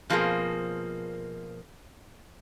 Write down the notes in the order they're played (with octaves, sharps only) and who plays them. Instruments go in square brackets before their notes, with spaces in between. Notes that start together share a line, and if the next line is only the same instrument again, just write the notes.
[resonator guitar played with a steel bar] B2 F3 A#3 C4 G#4 A#4